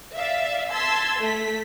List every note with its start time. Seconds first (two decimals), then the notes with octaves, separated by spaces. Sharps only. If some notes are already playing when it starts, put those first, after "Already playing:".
0.16 D5 E5 F5
0.72 A5 C6 E6 G#6 B6
1.20 A3 B6